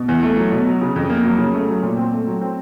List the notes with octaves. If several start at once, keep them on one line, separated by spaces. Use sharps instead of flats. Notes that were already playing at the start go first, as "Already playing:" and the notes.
Already playing: B2
E2
A3
F#3
B2
F#3
C#3
F2
A#3
F#3
C#3
A3
F#3
A#2
C4
A3
F#3
C4